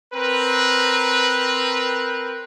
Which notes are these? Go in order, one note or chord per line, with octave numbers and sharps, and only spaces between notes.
C4 A#4 B4